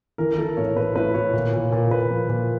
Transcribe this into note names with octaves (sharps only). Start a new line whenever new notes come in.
E3 A#4
A#4
E3 A4
A2 C#5
A2 B4
A2 B4
A2 C#5
A#2
A#2
A#2
A#2 B4
F3
A#2